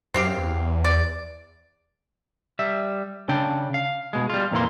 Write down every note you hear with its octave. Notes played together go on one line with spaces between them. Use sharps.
F#2 C4 G4 F5
E2
D5
G3 E5
C#3 D4 G5
F5
B2 G#3
G3 F4
F2 A#2 E3 A#3 C6